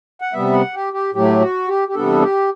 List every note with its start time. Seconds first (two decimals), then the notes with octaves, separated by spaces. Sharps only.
0.21 F#5
0.33 C3 G3 B3 E5
0.53 F#5
0.74 G4
0.93 G4
1.14 A2 F#3 A3 G4
1.41 F#4
1.68 G4
1.88 G4
1.95 E2 C3 G3 B3 D4 A4
2.21 G4